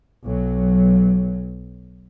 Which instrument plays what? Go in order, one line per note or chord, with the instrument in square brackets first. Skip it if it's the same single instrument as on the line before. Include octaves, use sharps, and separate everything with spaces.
[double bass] B1 F#3